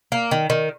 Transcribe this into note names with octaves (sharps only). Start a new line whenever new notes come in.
A#3
D#3
D#3